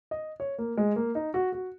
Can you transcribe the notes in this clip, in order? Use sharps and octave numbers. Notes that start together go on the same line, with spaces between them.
D#5
C#5
A#3
G#3
A#3
D#4
F#4
F#4